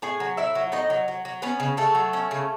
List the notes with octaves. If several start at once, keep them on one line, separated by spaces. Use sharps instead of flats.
A2 G#4 G#5
F#3
A2 E4 E5
F#3
A2 D#4 D#5
F#3
F#3
F#3
B3 C#4 B4
C#3
C#3 A3 A4
F#3
C#4
C#3